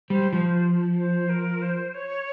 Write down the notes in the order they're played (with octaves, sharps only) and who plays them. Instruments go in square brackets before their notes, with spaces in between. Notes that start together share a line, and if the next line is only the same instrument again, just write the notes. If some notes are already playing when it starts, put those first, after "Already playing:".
[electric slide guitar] G3 [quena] C5
[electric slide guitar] F3 [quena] C5
[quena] C5
A#4
C5
C#5